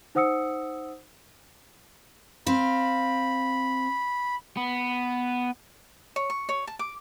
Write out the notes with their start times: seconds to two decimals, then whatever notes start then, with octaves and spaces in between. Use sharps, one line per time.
0.15 D#4 C5 F#5 D#6 E6 C#7
2.47 C4 F5 B5
4.57 B3
6.16 C#5
6.30 C#6
6.49 C#5
6.67 A5
6.79 D6